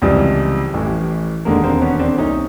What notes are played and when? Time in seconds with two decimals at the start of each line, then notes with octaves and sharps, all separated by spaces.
0.02 C#2 C3 E3 F3 G3
0.74 A1 A2 E3
1.45 E1 D#2 D3 G#3 A#3
1.64 A#3 C4
1.81 B3 C#4
1.99 C4 D4
2.18 C2 A#2 C#4 D#4